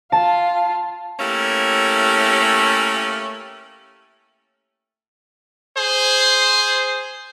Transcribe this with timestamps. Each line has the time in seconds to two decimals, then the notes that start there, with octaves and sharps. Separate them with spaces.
0.12 F4 F5 A5
1.20 A3 A#3 C#4 E4 G4
5.77 G#4 C5